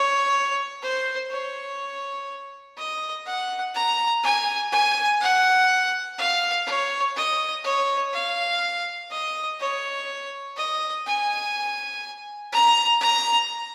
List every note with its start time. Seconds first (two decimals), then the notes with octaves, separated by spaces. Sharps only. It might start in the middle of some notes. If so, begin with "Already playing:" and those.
Already playing: C#5
0.82 C5
1.31 C#5
2.77 D#5
3.26 F#5
3.75 A#5
4.23 G#5
4.72 G#5
5.21 F#5
6.18 F5
6.67 C#5
7.16 D#5
7.64 C#5
8.14 F5
9.11 D#5
9.59 C#5
10.57 D#5
11.06 G#5
12.52 A#5
13.01 A#5